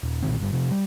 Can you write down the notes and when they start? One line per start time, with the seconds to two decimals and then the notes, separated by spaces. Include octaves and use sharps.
0.03 D#1
0.23 B1 A#2 D#3 C4
0.40 G1 G2
0.53 C3 F3
0.71 G3